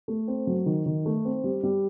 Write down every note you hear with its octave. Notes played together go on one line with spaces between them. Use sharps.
A3
C4
F#3
D#3
D#3
A3
C4
G3
G3